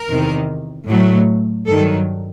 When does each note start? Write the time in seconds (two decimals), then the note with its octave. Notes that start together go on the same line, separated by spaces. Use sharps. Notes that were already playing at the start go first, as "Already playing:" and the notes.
Already playing: A#4
0.10 E2 C3 D#3
0.88 A2 F#3 A3
1.67 G2 D#3 F#3 A4